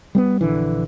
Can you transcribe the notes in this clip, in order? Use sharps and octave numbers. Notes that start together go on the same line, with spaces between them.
G3 A#3 B3
A#1 D3 E3